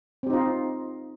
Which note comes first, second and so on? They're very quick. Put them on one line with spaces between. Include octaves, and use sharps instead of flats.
C4 G4 D#4 F4